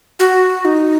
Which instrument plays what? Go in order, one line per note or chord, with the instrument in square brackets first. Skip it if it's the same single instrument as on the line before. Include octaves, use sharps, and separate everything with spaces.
[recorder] F#4
D#4